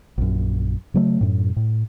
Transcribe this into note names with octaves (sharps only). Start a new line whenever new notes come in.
A#1 F#2
C#3 F#3 A3
F#2 A2
A2